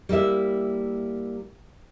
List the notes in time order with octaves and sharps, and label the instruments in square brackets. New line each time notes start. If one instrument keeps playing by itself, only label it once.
[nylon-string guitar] G3 A#3 E4 E5